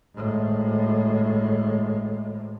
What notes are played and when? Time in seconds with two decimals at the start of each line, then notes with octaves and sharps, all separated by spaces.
0.15 G#1 A2